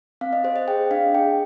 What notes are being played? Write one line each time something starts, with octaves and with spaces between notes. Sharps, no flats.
C4 F5
D#5
G4 C5
D#5
G#4 G5
D4 F5
G#4 G5